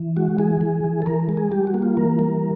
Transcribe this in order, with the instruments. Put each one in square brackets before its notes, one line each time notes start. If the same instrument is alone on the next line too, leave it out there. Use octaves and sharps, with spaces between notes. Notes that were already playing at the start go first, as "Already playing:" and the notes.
Already playing: [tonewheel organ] E3
G#3 F#4
E3 G#4
E3
E3
A4
E3 A#4
G#3
G#4
G3 G4
F#4
A#3
F4
E3 A#4
G3